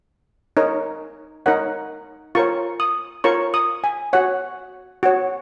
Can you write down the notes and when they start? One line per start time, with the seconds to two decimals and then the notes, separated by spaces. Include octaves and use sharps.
0.57 D#4 A#4 C#5
1.46 D#4 A#4 C#5 F#5
2.35 F4 A#4 C#5 C#6
2.80 D#6
3.24 F4 A#4 C#5 C#6
3.54 D#6
3.84 G#5
4.13 F#4 C#5 F#5
5.03 F#4 C#5